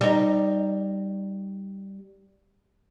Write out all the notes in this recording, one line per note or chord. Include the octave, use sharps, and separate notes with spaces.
G3 D#4